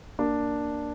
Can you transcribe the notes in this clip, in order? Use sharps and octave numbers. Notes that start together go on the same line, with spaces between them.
A#3 D4